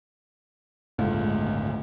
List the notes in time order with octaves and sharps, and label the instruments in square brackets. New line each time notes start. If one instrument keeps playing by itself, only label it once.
[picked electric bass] G1 A2 A3 [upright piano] C#2